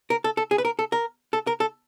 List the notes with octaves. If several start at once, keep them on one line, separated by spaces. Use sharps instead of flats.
A#4
A4
A4
G#4
B4
A#4
A4
A#4
A4
A#4
A4